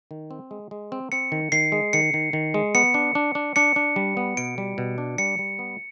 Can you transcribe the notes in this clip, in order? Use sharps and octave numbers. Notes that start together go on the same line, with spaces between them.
D#3
C4
G#3
G#3
C4
C4 C#7
D#3
D#3 C7
G#3
D#3 C#7
D#3
D#3
G#3
B3 C#7
D4
D4
D4
D4 C#7
D4
G3
B3
B2 D7
G3
B2
D4
G3 C#7
G3
B3